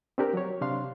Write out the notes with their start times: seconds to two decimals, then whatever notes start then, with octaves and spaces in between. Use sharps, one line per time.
0.18 C4 D4 G4 A#4
0.34 F#3 C#5
0.61 C3 D4 F5 C6